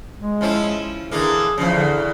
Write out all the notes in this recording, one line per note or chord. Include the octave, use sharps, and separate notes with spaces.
G#3
F3 C#4 E4
D3 E3 A#3 G#4
E2 G#2 C#3 F3
D3